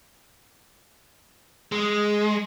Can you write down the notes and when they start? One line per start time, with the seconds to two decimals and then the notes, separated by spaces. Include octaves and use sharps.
1.72 G#3